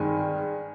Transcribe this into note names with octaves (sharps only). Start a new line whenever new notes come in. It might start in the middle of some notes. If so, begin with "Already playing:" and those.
Already playing: G2 D#3 G#3 C4 G#5